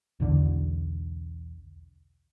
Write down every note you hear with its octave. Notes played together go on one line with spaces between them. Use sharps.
B1 E2 D3